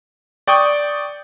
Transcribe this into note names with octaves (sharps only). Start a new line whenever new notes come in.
D5 G5 C#6 D#6 G6